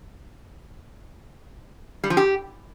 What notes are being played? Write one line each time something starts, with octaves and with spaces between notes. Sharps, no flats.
G3
F3
G4